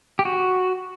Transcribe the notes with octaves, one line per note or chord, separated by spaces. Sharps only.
G4
F#4